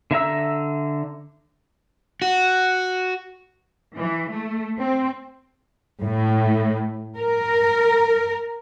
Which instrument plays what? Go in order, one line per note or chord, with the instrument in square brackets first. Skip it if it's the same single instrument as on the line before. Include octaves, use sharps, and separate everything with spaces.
[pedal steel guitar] D3 E5 A#5 E6
[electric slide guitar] F#4
[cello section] E3
A3
C4
A2
A#4